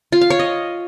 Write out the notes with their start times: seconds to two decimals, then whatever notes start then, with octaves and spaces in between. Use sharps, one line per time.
0.12 F4
0.21 F5
0.30 C#5
0.39 D#5